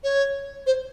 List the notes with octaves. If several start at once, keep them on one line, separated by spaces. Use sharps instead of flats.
C#5
C5